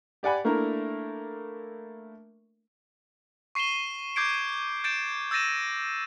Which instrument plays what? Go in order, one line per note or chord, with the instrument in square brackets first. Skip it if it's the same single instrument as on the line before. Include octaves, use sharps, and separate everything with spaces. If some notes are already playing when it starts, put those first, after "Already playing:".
[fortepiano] G4 D5 F#5 G#5 B5
A3 A#3 D4 E4 A#4
[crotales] C#6 C7 D#7 E7 G7
D6 G6 G#6 C7 D7
G6 A6 D7 E7
E6 G6 A6 A#6 D#7 E7